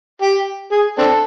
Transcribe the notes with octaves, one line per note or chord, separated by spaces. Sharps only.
G4
G#4
C4 D4 A4